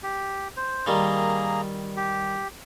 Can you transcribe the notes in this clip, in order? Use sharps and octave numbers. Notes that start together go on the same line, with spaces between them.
G4
C5
D#3 G3 A#3 G#4 A#5
G4